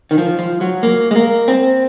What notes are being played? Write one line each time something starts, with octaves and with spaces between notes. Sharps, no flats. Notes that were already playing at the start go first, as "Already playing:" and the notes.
D#3
F3
F3
F#3
A#3
G#3
A#3
C4